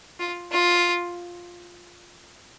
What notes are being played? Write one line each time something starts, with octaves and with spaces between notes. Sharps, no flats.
F4
F4